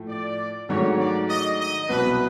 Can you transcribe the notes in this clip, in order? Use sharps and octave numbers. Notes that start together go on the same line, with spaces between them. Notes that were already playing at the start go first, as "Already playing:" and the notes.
Already playing: A2 F3 A3
D5
G#2 D#3 F#3 A3 D4 C#5
D5
D#5
D#5
C2 B2 F#3 B3 B4